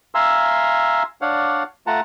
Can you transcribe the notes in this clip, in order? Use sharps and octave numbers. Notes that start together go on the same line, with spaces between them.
E5 F5 G#5 A#5 C6 E6
D4 C#5 D5 F5 F#5
A3 F4 F#5 A5 A#5